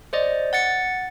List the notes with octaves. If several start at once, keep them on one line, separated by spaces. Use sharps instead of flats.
C5 D5 D#5
F#5 A6 C#7